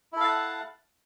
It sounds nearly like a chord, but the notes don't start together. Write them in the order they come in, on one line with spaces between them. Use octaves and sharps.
E4 A4 F5 A5 F#5